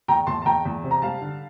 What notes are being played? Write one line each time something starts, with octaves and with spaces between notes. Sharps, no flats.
E2 G5 A#5
E2 A5 C6
A5
E2 G5 A#5
E2
C3
A#5
G3 F5 A5
D3